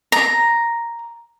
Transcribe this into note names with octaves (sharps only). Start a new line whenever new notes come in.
A#5